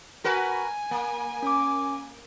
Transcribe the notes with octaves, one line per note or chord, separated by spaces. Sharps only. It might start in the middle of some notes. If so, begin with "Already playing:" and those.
F#4 A#4 B4 G#5
A#3
C#4 D6